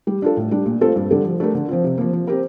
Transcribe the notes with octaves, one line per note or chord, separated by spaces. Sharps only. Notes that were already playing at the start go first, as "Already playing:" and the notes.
G3
D4 F4 A4
A2
G3 D4
A#2
A3 C4 F4 A4
G2
D3 G3 D4 A4
F3
A3 D4 G4 A#4
D3
F3 C4 F4
C3
F3 A#3
F3
C4 G4 A#4